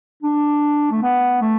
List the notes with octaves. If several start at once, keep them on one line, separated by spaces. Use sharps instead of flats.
D4
A3
B3
A3